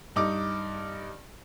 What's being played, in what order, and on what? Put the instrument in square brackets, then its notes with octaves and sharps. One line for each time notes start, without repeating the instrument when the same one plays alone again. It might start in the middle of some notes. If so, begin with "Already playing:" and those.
[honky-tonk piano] G2 D#4 D6